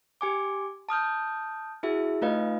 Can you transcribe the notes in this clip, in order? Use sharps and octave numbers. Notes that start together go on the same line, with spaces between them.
G4 G#5 D6
A5 D#6 F6 G6
E4 F#4 G#4 E5
A3 D#4 F4 B4 D#5 F5